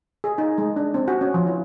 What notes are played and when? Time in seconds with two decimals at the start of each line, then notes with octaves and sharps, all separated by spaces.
0.24 G#4
0.38 D#4
0.58 G#3
0.76 D4
0.94 C4
1.08 F#4
1.21 C#4
1.34 F3
1.47 E4